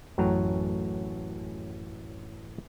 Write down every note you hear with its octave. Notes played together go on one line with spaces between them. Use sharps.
A1 F#2 A2 F#3 G5 A#5